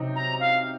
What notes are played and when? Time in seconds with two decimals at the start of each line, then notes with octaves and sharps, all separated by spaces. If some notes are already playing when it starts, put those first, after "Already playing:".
Already playing: C3 F#3 C4 D#4
0.16 A#5
0.40 F5